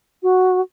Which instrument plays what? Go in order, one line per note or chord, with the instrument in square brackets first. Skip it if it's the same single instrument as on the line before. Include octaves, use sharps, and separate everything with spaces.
[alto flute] F#4